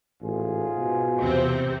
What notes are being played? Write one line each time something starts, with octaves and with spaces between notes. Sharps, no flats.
A1 G#2 F4 G#4
B2
E2 C3 C4